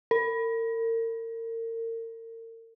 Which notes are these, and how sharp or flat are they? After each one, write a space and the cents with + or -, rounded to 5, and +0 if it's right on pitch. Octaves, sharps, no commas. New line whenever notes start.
A#4 -40